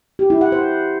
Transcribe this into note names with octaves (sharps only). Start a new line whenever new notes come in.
G4
E4
F#5
C5